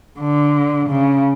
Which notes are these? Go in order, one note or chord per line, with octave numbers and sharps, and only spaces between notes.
D3
C#3